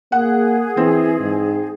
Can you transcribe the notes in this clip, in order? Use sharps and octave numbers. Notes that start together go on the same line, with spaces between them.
A#3 G#4 F#5
E3 C4
G#2